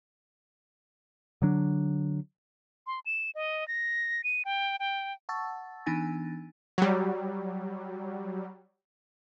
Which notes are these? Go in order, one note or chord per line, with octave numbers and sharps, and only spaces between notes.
D3 F#3 D4
C6
E7
D#5
A#6
D#7
G5
G5
F#5 A5 C#6 E6 A6
E3 B3 D4 D#4 G#5 A6
F#3 G3